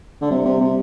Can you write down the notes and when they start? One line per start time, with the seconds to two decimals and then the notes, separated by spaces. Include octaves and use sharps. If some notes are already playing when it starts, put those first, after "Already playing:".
0.21 D3
0.30 C3 G3
0.45 C3
0.61 C3